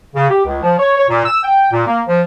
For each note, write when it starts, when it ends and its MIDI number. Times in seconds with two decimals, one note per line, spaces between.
0.15 0.28 49
0.30 0.42 67
0.46 0.61 37
0.63 0.75 53
0.79 0.96 73
0.97 1.05 73
1.09 1.24 46
1.25 1.40 88
1.44 1.70 79
1.72 1.84 46
1.87 2.02 58
2.07 2.22 53